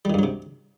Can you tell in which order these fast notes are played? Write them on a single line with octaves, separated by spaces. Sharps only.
G3 D#3 G2 F#3 C3